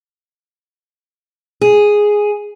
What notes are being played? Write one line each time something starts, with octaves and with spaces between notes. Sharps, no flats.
G#4